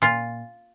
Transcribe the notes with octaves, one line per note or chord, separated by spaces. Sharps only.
A#2 F4